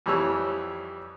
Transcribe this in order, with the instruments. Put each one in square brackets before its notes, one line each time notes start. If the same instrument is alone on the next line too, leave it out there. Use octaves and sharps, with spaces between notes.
[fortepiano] F2 E3 G3 C#5 E6